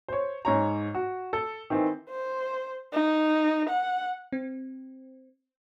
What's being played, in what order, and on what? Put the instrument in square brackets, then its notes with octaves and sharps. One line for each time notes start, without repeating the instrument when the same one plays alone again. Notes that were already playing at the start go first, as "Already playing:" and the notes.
[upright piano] C5 C#5
G#2 C#5 A#5
F#4
A4
D#3 E3 C4
[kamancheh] C5
D#4
F#5
[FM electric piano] C4